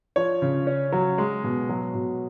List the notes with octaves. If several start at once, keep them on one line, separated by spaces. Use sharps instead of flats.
F3 C#5
C#3
C#4
F#3
G#3
B2
F#3
B2